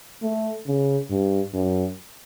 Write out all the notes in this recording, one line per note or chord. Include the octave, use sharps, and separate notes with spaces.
A3
C#3
G2
F#2